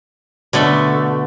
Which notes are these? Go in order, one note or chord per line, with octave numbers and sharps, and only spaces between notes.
B2 D3 A3